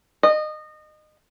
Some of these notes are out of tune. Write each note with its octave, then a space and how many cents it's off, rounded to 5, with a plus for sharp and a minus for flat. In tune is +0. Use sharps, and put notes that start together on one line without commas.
D#5 -25